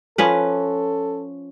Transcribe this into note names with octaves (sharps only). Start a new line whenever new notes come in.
F3 C#4 A4 B4